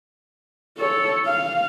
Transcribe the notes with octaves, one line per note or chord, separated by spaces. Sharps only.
A4 C#5
F5